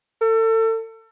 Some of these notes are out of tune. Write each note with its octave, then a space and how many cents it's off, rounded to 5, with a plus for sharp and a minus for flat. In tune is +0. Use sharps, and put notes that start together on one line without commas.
A4 +30